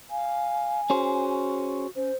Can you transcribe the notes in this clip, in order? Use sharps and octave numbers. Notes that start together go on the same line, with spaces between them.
F5 G#5
C#4 F#4 G#4 C5
C#4 C5